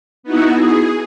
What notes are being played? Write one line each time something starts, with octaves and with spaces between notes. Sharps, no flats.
B3 D#4 E4 F#4
G#4